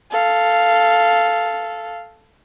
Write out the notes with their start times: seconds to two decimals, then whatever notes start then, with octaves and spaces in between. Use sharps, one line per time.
0.11 A4 F5